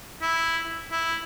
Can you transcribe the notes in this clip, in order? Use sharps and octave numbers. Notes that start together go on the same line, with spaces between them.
E4
E4